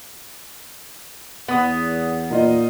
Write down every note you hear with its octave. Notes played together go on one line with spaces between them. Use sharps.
E2 B3 F#5 D#6
A#2 D#4 F4 D#5